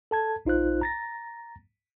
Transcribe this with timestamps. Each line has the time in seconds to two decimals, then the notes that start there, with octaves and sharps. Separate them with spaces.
0.11 A4 A5 G#6
0.45 A#1 D#4 F4 C5 F#6
0.81 A#5 A6 A#6